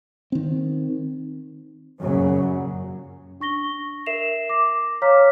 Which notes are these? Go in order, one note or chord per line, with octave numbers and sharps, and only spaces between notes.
D#3 C4
F#2 A#2 C#3 F#3
D4 C#6 A#6 G7
A#4 E5 C7 E7 F7
D6 A#6
C#5 F5 A#5 D6 F6 B6